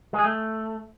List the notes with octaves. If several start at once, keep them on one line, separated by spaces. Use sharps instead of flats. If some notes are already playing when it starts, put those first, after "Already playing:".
G#3
G#4
A3